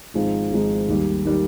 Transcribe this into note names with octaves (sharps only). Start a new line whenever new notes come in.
G#1 G#2 F3 G#3 D#4
G#1 G#2 F3 G#3 D#4
D#2 D#3 G3
D#3 G3